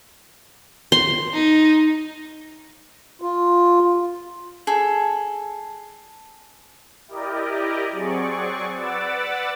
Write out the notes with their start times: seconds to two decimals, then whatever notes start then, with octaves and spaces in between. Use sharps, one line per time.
0.92 C6
1.33 D#4
3.22 F4
4.67 G#4 A4
7.08 E4 G4 A#4 D5 D#5
7.92 F#3 C4 G#4 D5 C#6
8.74 B4 D5 F#5 D6 E6 A6